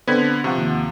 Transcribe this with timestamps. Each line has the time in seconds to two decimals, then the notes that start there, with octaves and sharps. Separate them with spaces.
0.07 D3 B3 C4 B5 G#6
0.44 C3 F3 F#5 C#6
0.58 D#2